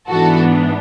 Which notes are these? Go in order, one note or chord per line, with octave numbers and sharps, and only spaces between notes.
G#2 E3 B3 D4 F#4 A4